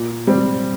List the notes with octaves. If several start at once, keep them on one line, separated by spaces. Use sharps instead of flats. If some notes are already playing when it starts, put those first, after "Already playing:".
Already playing: A#2
G3 C4